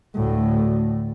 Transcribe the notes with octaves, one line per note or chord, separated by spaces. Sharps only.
D2 A2